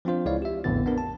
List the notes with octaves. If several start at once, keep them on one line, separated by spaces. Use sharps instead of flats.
F3 C4 D4 F4 C5
C#2 G#3 E4 C#5 D5 F5
G4 E5
A#1 F2 A2 D3 B3 A6
B3 D4 A#4
A5